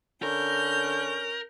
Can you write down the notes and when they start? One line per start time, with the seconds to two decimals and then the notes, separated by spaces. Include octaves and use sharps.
0.23 D3 C#4 A#4 G6